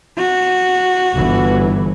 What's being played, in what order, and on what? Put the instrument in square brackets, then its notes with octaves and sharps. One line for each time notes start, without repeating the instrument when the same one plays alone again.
[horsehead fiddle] F#4
[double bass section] G1 E3